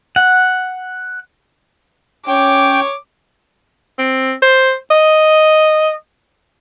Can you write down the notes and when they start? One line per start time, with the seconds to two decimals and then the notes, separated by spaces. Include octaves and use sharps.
0.16 F#5
2.28 C#4 C#5 G5 D6
3.99 C4
4.42 C5
4.91 D#5